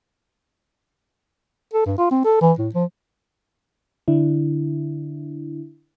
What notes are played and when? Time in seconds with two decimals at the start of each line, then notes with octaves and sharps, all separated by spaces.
1.74 A4
1.86 G2
1.98 F4
2.11 C4
2.25 A4
2.41 E3
2.59 A2
2.74 F3
4.08 D3 D4 E4